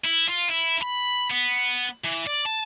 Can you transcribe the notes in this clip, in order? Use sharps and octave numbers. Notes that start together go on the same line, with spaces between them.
E4
F4
E4
B5
B3
E3
D5
A5